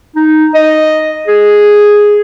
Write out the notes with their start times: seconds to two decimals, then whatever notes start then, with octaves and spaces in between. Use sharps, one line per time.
0.16 D#4
0.55 D#5
1.28 G#4